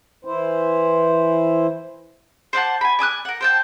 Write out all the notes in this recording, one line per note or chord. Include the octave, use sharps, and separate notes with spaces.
E3 E4 C5
C5 D5 F#5 A5
G#5 B5
D5 G#5 D#6 F#6
A#4 F#5
C5 G5 A5